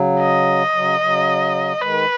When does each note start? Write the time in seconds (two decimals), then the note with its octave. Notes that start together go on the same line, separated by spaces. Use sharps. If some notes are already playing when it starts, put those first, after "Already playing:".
Already playing: C#3 F#3
0.20 D#5
0.73 C#3 F#3
1.00 C#3 F#3
1.81 D#3 G#3 B4